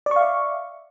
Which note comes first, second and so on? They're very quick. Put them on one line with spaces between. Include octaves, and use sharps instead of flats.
D5 C#6 F5 E5